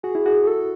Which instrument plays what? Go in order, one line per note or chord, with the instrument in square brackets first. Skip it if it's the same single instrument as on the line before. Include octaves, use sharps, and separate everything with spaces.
[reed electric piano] F#4 [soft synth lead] G#4
[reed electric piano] E4
[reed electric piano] F#4 [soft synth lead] G#4
[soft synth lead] G#4
A4